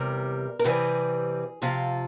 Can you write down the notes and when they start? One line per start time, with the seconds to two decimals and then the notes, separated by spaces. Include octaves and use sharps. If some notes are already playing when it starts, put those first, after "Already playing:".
Already playing: E2 C3 G3 A#4
0.59 A#4
0.64 C3 E3 G3 C4 G#4
1.62 F2 C3 F3 F4